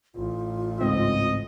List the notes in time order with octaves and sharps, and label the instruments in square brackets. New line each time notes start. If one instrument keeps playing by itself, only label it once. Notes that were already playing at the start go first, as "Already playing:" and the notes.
[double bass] A1 [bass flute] F4
[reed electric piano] C#2 G#2 C4 [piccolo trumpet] D#5